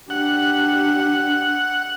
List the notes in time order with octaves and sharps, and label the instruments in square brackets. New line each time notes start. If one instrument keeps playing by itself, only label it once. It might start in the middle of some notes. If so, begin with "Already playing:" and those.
[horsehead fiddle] D4 G4 [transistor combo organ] F#5